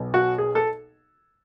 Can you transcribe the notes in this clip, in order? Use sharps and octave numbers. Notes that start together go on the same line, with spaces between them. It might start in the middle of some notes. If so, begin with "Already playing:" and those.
Already playing: B1 B2
F#4
G#4
A4